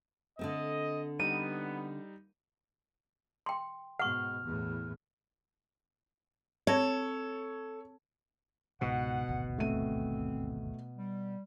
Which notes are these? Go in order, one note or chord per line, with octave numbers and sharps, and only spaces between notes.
D3 A3 C4 D#5
G3 B3 D#4 D#7
G5 C6
G#2 B2 F#5 C#6 F6
E2 A2
C4 A4 C#5 G#6 A#6
C#2 G#2 B2 F#5
D#1 G#1 D2
A3 C4 D#7
G3